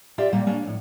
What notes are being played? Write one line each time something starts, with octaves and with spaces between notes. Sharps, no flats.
F4 G4 D5 E5
A#2 G3 A#3
A#3 C#4 D4
F2 A2